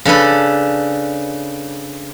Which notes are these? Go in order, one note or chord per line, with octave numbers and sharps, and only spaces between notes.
C#3 D4 A4 B4